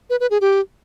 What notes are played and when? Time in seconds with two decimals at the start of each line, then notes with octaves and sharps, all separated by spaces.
0.10 B4
0.20 B4
0.31 G#4
0.41 G4